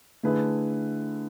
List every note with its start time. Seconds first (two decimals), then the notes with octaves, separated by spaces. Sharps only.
0.23 D3 A3 E4 G#4 B4